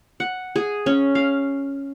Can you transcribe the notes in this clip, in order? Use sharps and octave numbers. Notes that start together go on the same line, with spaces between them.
F#5
G#4
C#4
F5